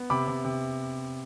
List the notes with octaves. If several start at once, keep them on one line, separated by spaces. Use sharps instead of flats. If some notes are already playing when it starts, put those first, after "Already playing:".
Already playing: B3
C3 B5 D6
C3
C3